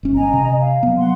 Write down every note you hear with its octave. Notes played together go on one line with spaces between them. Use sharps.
G1 C#4
D#5 G#5 A#5
C3
F5
F#3 B3
F#5 C6